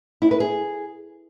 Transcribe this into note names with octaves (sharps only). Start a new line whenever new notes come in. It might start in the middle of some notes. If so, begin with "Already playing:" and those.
E4
B4
G#4